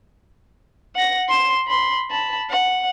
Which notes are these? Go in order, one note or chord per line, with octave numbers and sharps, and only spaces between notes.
F#5 A#6
C6 E7
B5 C6
A5 B5
F#5